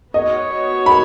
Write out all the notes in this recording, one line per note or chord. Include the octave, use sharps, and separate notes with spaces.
B3 F#4 C#5 D#5
B5